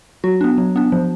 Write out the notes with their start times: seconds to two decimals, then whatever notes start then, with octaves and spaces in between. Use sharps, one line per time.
0.24 F#3 F#4
0.41 B3 D4
0.58 F#3
0.76 B3 D4
0.92 F3